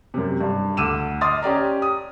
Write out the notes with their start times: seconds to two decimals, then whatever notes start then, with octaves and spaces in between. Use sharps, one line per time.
0.14 F#2 C3
0.41 G2
0.77 D2 D6 E6 D#7 E7
1.21 D#5 C6 D6 D#6 F6 A6
1.42 C#4 G4 D5 A#5
1.82 D#6